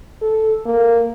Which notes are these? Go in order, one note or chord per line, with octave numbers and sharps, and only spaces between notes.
A4
A#3